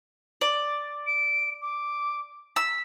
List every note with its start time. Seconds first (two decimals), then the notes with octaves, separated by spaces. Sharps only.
0.41 D5
1.07 D7
1.62 D6
2.56 E6 B6